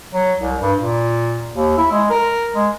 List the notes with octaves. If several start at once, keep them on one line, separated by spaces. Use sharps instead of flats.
F#3
C2
G2
A#2
D#2
E4
G#3
A#4
G#3